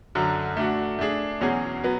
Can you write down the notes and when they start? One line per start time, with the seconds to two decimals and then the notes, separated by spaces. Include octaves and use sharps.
0.15 F#2 D3 F#3
0.57 A3 D4 F#4
0.99 A3 D4 G#4
1.41 E2 B2 F#3 C#4 G#4
1.84 F#3 B3